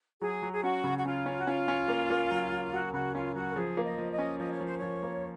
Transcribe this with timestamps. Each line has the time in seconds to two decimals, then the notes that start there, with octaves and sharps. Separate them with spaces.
0.21 F#3 G#4
0.42 F#3
0.52 G#4
0.63 C#4 F#4
0.84 C#3
0.97 F#4
1.05 C#4 F4
1.26 C#4
1.38 F#4
1.47 C#4 F4
1.68 C#4
1.88 A#3
2.10 A#3
2.31 F#3
2.52 F#3
2.72 F#3 F#4
2.93 C#3 F#4
3.14 C#4 F4
3.35 F#3 F#4
3.50 A#4
3.56 F3 G#4
3.77 A#3
3.84 D#5
3.98 F3
4.11 D#5
4.18 C#4
4.39 F3 D#5
4.52 C#5
4.60 F3 C5
4.78 F3 C#5
5.03 A#3